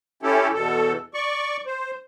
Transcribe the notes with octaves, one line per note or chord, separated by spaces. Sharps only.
C#4 E4 G4 A4
E2 B2 A4
D5 C#6
C5